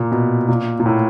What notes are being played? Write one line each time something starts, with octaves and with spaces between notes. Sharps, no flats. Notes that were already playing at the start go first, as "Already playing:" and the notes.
Already playing: A#2
B2
A#2
A#2
A2